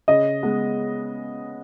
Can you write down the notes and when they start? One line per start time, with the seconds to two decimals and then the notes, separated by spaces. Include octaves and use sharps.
0.08 C#3 D#5
0.43 G#3 B3